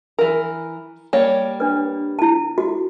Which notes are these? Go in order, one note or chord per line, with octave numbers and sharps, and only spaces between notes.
E3 A#4
G3 A#3 C#5
D4 B4
E4 A5
F#4